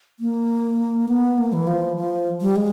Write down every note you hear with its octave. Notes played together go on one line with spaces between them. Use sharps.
A#3
B3
A#3
E3
F3
F3
G3
G#3